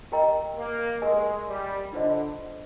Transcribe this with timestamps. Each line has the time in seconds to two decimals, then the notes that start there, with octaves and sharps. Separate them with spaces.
0.12 G4 A#4 D#5 G5 A#5
0.58 A#3
1.02 G#3 G4 A#4 D#5 G#5
1.47 G3
1.92 D3 D4 F4 C5 D#5